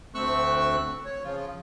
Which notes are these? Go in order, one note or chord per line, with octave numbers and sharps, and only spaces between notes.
D2 A3 C4 C#6 E6 F#6
C#5
C#3 F3 F4